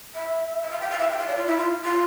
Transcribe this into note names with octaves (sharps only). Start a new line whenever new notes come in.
E5
E5
F5
G5
F5
E5
G5
F5
D5
F4
E4
F4
F4